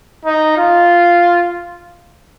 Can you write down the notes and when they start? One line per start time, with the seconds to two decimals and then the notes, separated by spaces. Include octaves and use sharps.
0.25 D#4
0.58 F4